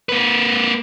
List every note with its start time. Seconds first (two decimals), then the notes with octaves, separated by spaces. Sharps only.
0.09 A#3 B4